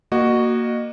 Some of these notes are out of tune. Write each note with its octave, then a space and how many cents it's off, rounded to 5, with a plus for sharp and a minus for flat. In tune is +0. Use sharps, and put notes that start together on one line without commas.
A#3 +0 F#4 +0 D#5 -30